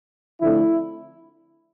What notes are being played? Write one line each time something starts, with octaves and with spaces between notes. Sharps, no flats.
D3 F3 A3 C4 E4